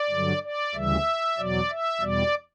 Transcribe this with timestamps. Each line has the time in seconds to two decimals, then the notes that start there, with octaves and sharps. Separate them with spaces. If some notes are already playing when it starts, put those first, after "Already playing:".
Already playing: D5
0.10 G2 D3 F#3
0.43 D5
0.74 D2 C#3 E3 G3 E5
1.38 E2 B2 F#3 D5
1.70 E5
2.01 E2 B2 G3 D5